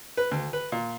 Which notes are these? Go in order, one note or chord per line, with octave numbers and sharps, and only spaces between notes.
B4
D2
B4
A#2